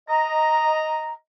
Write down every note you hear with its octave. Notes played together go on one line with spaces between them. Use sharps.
D#5 A#5